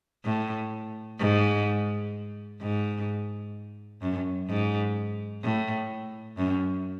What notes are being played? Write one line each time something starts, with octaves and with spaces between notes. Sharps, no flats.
A2
G#2
G#2
F#2
G#2
A2
F#2